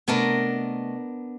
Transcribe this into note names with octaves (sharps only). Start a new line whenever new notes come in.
C3 A3 B3 D4 A#4 D#5